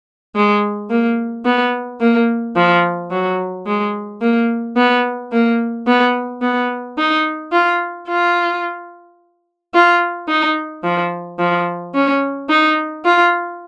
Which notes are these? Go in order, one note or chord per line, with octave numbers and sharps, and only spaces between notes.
G#3
A#3
B3
A#3
F3
F#3
G#3
A#3
B3
A#3
B3
B3
D#4
F4
F4
F4
D#4
F3
F3
C#4
D#4
F4